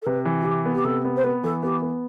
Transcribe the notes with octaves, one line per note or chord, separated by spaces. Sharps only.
A4
C3 B4
E3
F#4
C3 G4
B3
G4
C3 A4
B3
C5
B3 B4
E3 A4
B3 G4
B3